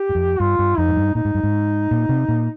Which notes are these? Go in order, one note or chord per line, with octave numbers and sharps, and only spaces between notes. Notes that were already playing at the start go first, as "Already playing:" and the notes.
Already playing: G4
G2
F2
G2 F4
G2
F2 D#4
G#2
G2
A#2 D#4
G#2
G2
G#2
A#2
C3
A#2